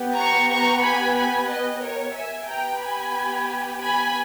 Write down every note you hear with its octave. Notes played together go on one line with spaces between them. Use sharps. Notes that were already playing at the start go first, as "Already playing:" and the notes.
Already playing: B3 G4
A#5 C#6
A#5 C#6
G#5 B5
G#5 B5
B4 D#5
A#4 C#5
E5 G#5
B3 G4 G5 A#5
G#5 B5
G#5 B5